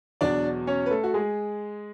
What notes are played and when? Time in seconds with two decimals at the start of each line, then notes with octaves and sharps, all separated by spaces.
0.21 E2 B2 F#3 D4 D5
0.67 C#4 C#5
0.86 B4
0.91 A3 A4
1.04 F#4
1.14 G#3 G#4